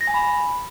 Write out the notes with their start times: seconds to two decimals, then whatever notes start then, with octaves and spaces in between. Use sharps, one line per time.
0.01 A#6
0.07 G#5
0.14 B5